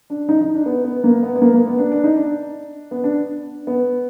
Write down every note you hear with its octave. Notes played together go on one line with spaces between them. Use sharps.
D4
D#4
D#4
D4
B3
B3
A#3
B3
B3
A#3
A#3
B3
D4
D4
D#4
D4
B3
D4
B3